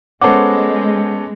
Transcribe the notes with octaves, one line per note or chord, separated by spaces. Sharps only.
G#3 B3 C#4 A4 C5 F#5 D6